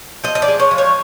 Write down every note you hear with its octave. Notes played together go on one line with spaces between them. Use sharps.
F3 D#5
D#5
D5
G#3
C#5
F3
C#5